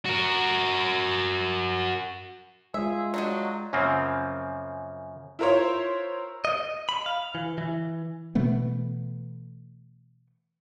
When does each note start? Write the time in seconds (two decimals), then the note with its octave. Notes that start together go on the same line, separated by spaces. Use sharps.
0.05 F#4 A#4
2.74 G#3 F4 G#4 E5
3.14 F#3 D4 F#4 D#5 G5 A#5
3.73 F#2 C#3 F3 A#3 C4
5.39 E4 F4 A#4 C5 C#5
6.45 D#5
6.89 B5
7.06 F5
7.35 E3
7.58 E3
8.35 B2 E3 A3 B3